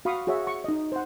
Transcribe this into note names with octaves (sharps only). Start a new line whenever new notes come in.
F#4 F5 B5 C#6 D#6
F#4 G#4 C#5 E5 F#5
C#6
D#4 D#5
C5 F#5